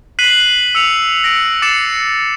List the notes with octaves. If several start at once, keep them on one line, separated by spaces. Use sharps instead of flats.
F#6 B6 C7 D#7 F#7
E6 C#7 F7
A#6 C#7 D7
D6 A6 C7 C#7 E7